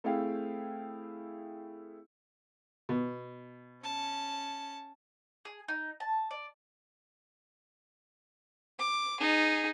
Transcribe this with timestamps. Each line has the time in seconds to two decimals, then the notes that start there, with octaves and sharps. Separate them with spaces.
0.04 A3 C4 E4 G#4 F5 G5
2.89 B2
3.83 C#4 A5
5.45 G#4
5.68 D#4
6.00 A5
6.31 D5
8.79 D6
9.20 D#4 G#4